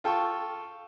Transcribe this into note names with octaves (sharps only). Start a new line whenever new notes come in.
F4 A4 G5 A5 C#6